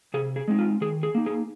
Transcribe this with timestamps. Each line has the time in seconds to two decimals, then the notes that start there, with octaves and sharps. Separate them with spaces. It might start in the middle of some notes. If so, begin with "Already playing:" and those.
0.14 C3 G#4
0.36 G#4
0.48 G#3 C4 D#4
0.59 F4
0.81 D#3 G#4
1.03 G#4
1.15 A#3 D#4
1.26 G#4